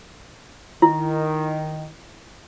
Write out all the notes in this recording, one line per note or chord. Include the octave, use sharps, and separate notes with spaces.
D#3 E4